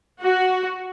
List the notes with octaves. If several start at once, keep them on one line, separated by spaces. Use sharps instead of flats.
F#4